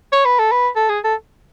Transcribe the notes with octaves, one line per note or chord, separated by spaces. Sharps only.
C#5
B4
A4
B4
A4
G#4
A4